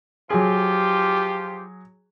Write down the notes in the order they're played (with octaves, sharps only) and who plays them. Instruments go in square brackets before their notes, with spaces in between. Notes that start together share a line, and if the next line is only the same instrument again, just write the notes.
[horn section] F3 F4 G4 [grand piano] F#3 G#4